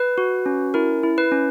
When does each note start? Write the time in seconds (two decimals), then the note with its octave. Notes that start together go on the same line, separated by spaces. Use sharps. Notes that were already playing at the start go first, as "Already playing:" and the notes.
Already playing: B4
0.18 F#4
0.46 C#4
0.74 E4 A#4
1.03 E4
1.18 B4
1.31 C#4